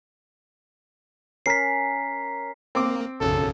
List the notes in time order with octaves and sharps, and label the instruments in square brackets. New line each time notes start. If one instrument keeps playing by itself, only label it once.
[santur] C#4 A#4 [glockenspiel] B6 C7
[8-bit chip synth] A#3 [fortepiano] C4 D6
[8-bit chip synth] B1 F#2 C#3 [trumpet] A4